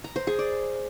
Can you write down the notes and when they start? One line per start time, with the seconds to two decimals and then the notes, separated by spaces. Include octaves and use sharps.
0.04 A#5
0.16 C5
0.27 G#4
0.39 D5